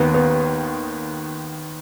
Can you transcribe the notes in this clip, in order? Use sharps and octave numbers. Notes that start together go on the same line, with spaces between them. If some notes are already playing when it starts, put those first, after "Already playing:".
Already playing: D#2 D#3 B3
B3